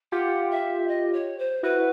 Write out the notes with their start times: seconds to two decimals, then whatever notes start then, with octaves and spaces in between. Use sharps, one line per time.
0.12 F4 G4 F#5
0.50 E5
0.87 D#5
1.13 C#5
1.38 C5
1.63 E4 F#4 B4